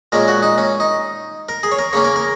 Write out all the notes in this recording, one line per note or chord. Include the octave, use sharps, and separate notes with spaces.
A#2 G#3 C#4 A#4
F#4
D#4
C#4
D#4
A#4
G#4
C#5
A#4
C#3 A#3 C#4 C#5
A#4
A#4